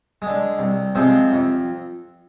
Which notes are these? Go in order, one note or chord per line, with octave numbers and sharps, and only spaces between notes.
D3 G#3
C2
C3 F3 G#3 C4
F2